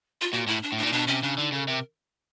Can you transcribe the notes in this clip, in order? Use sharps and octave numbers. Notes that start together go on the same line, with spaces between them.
F4
A#2 F#4
A2 E4
D4
A2
A#2 D4
D#4
B2 D4
C3 C#4
C#3 D4
D3 D#4
C#3 A4
C3 A#4